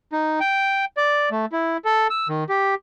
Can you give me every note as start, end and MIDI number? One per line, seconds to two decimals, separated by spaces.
0.12 0.39 63
0.40 0.85 79
0.97 1.29 74
1.31 1.45 57
1.52 1.77 64
1.85 2.07 69
2.10 2.28 88
2.29 2.44 51
2.49 2.75 67